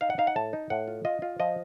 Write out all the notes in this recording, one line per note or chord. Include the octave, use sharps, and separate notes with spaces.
D#4 F5
F#5
D#4 F5
F#5
A2 A5
D#4
A2 F#5
F4
F4 D#5
F4
F3 D#5